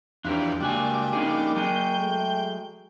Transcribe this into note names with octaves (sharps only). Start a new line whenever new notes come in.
E2 F3 D4 G4 A#4
C#2 G3 A#3 D4 F#4 G#5
C#4 D#4 G#4
F#3 G#4 G5
G#3 A3